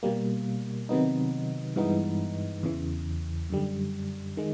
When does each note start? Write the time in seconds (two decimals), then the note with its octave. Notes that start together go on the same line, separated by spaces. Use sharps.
0.03 B2 G3 A#3
0.89 C3 D#3 F#3 B3 D#4
1.76 G2 E3 G#3 B3 D#4
2.63 E2 C#3 E3
3.50 F#2 D3 G3
4.37 D#3 G#3